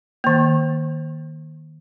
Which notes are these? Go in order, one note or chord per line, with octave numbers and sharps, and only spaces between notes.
D#3 A#3